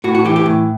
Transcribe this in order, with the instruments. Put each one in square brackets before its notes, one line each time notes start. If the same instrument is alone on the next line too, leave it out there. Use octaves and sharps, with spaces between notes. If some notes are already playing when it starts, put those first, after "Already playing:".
[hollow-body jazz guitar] A2 F#4
F#4
E3 G4
G4
A2